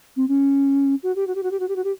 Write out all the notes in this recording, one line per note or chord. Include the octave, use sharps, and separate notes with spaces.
C4
C#4
F#4
G4
F#4
G4
F#4
G4
F#4
G4
F#4
G4